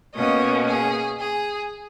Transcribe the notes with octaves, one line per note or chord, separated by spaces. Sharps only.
B2 A#3 C#4 D#5
G#4
G#4